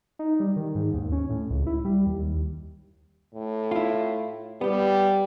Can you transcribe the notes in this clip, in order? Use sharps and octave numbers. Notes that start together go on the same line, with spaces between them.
D#4
G3
D#3
G#2
D#2
C#4
A2
C#2
E4
G3
D#2
A2
E4 F4
G3 B3 G4